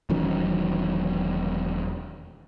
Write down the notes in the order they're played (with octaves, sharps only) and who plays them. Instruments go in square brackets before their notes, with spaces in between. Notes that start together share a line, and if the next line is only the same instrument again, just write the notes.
[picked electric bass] E1 D#3 F#3 C#4